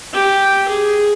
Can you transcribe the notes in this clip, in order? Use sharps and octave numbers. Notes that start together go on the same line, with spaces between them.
G4
G#4